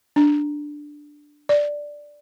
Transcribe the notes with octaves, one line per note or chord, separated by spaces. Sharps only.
D4
D5